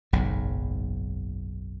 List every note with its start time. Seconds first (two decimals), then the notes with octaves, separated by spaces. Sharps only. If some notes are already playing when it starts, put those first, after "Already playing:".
0.13 F#1 B1 G#2